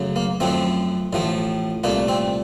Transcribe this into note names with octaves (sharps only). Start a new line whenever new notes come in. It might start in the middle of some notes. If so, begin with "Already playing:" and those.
Already playing: F#2 C#3 F#3 A3
A#3
F#2 F3 A3 C4
A1 A2 F3 A3
C2 A#2 A3 A#3
C4